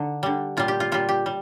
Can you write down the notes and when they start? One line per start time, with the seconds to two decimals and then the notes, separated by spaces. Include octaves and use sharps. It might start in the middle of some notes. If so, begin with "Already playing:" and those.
Already playing: D3 D#4
0.23 D3 G3
0.57 A#2 G3 F4
0.68 G4
0.80 F4
0.92 A#2 G3 F4
1.09 G4
1.26 G3